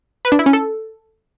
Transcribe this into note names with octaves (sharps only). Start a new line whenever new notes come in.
B4
D4
E4
C#4
A4